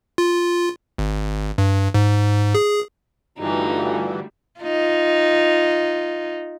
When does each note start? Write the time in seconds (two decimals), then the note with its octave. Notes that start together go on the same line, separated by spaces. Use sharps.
0.18 F4
0.98 G#1
1.58 G2
1.94 G#2
2.55 G#4
3.39 G2 D3 E3 G3 A3 D#4 F4 F#4
4.60 D#4 F4